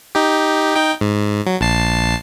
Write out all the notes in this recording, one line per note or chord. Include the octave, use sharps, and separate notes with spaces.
D#4 G4
D#4 G5
G#2
F#3
A#1 A5 C7